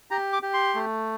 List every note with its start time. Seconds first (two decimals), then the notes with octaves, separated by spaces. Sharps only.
0.11 G4 A#5
0.33 D6
0.42 G4
0.54 C6
0.75 A3